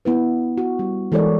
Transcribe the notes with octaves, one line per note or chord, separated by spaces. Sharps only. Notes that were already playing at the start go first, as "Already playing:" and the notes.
B3 E4 B4
F#4
G3
E3 G#3 A4 A#4 C#5 D5